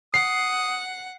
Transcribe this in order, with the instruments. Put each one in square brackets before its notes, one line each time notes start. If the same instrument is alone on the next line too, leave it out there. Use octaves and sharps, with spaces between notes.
[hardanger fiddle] F#5 [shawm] D#6 [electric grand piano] C7